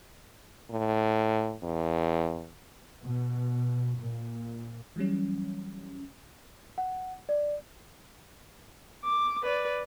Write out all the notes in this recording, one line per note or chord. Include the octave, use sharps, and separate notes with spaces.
A2
E2
B2
A#2
E3 F#3 G3 C#4
F#5
D5
D6
B4 D5